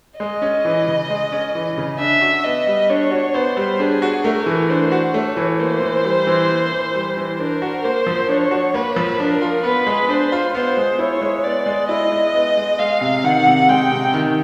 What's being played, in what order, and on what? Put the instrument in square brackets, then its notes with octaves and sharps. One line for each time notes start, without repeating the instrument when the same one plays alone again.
[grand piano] G#3 [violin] D#5
[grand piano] C#4
E3
C#3
G#3
C#4
E3
C#3
[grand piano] D4 [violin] E5
[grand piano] F#4
[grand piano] B3 [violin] D#5
[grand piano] G3
[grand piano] D4 [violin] C#5
[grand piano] F#4
[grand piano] B3 [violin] C5
[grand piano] G3
[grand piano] D4 [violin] G#4
[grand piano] F#4
[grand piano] A3 [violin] A#4
[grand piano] E3
[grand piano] D4 [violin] C5
[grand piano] F#4
[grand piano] A3 [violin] C#5
[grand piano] E3
[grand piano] A#3 [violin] C5
[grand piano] E3
G3
E3
A#3
E3
G3
E3
[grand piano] D4 [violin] A#4
[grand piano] F#4
[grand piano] A#3 [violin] C5
[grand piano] F3
[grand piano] D4 [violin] C#5
[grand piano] F#4
[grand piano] A#3 [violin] B4
[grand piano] F3
[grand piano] D4 [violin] A#4
[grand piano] F4
[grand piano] B3 [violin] B4
[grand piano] G#3
[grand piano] D4 [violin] C5
[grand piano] F4
[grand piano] B3 [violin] C5
[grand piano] G#3
[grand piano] E4 [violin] C#5
[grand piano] G#3
[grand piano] B3 [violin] D5
[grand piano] G#3
[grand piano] E4 [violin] D#5
[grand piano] G#3
B3
G#3
[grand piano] G#3 [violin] F5
[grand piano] C3
[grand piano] D#3 [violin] F#5
[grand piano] C3
[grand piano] G#3 [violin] G5
[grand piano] C3
D#3